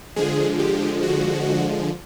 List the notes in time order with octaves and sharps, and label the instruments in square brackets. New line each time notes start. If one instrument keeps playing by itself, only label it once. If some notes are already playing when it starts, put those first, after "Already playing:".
[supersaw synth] D3 F3 G#3 G#4
G4
F#4